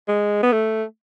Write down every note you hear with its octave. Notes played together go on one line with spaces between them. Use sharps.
G#3
B3
A3